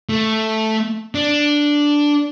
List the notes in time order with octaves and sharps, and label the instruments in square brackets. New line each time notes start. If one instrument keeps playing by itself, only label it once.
[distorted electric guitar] A3
D4